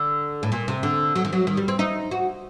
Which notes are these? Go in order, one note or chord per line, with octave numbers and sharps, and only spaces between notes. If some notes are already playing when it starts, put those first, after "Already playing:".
Already playing: D3
A2
A#2
C3
D3
F#3
D#3
F#3
D#3
G3
C4
D#4
F#4